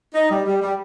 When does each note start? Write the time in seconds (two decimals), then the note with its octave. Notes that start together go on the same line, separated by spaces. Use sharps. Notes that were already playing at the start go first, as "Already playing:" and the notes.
0.14 D#4
0.30 G3
0.46 G3
0.62 G3